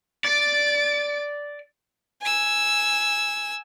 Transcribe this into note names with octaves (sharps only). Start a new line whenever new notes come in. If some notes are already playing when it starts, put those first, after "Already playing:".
D5 A6 D7
G#5 E6